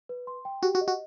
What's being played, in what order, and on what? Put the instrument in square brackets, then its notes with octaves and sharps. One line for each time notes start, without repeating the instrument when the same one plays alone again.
[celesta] B4
C6
G5
[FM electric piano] F#4 [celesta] G4
[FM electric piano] F#4
[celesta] D#5
[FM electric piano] F#4